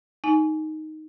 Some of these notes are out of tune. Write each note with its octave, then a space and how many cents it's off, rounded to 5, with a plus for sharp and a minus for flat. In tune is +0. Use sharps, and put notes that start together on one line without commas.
D#4 +0 G#5 +15